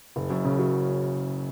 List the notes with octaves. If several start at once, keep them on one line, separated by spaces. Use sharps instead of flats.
F#1
F#2
C#3
F#3